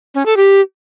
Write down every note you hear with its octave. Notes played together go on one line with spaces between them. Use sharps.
C#4
A4
G4